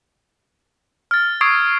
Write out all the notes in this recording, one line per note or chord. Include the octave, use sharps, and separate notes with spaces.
F6 A6
C#6 D#6 E6 G#6 C7 D7